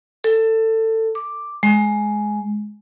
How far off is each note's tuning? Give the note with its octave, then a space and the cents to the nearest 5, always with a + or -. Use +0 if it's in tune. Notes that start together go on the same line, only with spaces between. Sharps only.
A4 +20
D6 +5
G#3 +10